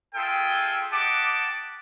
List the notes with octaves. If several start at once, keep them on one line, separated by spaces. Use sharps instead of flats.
F4 G#4 A4 E5 G5
G4 D#5 F#5 A5 D6